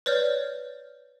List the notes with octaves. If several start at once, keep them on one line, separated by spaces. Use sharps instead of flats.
B4 C#5 D5 F6 G6